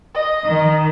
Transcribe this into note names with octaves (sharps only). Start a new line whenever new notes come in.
D#5
D#3